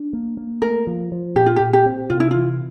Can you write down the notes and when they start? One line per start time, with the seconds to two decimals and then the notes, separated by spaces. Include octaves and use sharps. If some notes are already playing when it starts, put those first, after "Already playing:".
Already playing: D4
0.13 A#3
0.37 A#3
0.62 A3 A#4
0.87 F3
1.12 F3
1.36 A#2 G4
1.46 F4
1.56 G4
1.60 A#2
1.73 G4
1.86 C4
2.10 C3 F4
2.20 E4
2.31 E3 F4